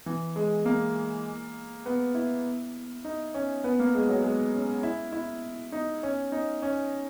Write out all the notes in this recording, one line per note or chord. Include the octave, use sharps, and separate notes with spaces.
E3
G#3
A#3
B3
E4
D#4
C#4
B3
A#3
G#3
F#3
G#3
C#4
E4
E4
D#4
C#4
D#4
C#4